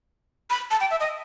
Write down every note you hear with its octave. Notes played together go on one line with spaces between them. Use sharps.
B5
A5
G5
E5
D#5